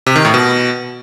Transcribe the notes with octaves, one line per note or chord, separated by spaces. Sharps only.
C3
D#3
A2
B2